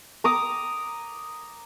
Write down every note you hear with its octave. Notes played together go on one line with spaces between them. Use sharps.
A#5 D6 D#6